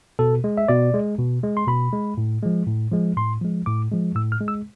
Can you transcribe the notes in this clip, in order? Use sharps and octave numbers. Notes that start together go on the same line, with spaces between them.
B2 A4
G#3
E5
B2 D5
G#3
B2
G#3
C6
B2 B5
G#3
A2
F3 G#3
A2
F3 G#3
A2 C6
F3 G#3
A2 D6
F3 G#3
A2 E6
F6
G#3
E6